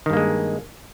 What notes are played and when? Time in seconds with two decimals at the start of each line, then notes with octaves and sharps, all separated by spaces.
0.06 D#3
0.10 G2
0.13 A#3
0.17 G#3